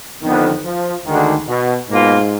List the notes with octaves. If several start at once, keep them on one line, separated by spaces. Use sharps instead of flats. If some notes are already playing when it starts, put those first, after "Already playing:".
F2 D3 D#3 F3 B3
F3
D2 D3 D#3 G#3 D4 F#4
B2
G#2 B2 A#3 F4